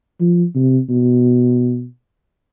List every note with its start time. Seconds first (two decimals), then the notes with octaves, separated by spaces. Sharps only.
0.20 F3
0.55 C3
0.90 B2